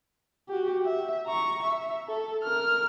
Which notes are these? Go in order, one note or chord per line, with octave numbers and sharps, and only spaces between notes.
F#4 G4
E5
A#5 C#6
E5
A4
A#4 F6